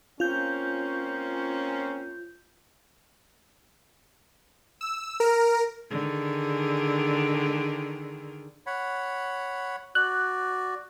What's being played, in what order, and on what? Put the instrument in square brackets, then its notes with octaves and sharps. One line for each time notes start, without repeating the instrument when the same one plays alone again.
[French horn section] A#3 C4 C#4 [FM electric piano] F4 G6
[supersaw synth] E6
A#4
[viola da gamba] D3 D#3 G#4
[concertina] C#5 F#5 B5
[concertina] F#4 D5 [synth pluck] F#6